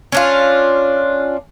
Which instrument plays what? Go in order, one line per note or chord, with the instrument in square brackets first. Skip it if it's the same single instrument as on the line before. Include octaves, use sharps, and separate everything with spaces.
[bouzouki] C#4 D4 F4